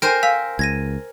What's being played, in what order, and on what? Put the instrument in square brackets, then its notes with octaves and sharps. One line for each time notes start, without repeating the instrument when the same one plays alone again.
[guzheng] A#4 C5 [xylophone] G5 G#5
[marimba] F5 [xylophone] G#5 E6 B6
[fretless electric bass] C#2 [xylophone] G#6 A#6 D#7